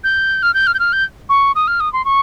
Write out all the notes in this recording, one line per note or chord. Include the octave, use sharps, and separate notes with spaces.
G6
F6
G6
F6
G6
F6
G6
C#6
D#6
F6
D#6
C6
C#6